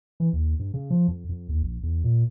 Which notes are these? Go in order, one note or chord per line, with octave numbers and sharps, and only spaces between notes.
E3
D#2
G2
C#3
F3
F2
F2
D#2
A#1
E2
A#2